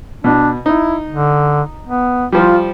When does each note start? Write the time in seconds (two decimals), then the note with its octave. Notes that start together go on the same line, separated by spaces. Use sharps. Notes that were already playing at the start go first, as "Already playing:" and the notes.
0.24 B2 D4
0.66 D#4 E4
1.09 D3
1.87 B3
2.32 F3 G3 F4